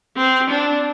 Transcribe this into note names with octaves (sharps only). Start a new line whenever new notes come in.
C4
D4